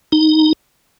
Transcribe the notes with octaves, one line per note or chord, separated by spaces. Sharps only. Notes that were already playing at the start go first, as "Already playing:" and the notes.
D#4